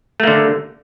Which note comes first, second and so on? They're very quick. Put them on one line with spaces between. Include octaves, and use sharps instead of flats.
A3 A#3 D3